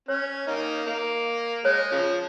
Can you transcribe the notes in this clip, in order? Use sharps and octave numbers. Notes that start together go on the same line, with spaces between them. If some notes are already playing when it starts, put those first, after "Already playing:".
C#4 C#5
A#3 D#4
A#3
G#3 C#5
C#3 F3